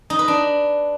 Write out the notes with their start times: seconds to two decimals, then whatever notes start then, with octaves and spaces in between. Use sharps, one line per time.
0.10 D#4
0.19 B4
0.28 D4